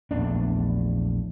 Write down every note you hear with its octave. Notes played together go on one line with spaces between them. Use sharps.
A#1 E2 A3 D4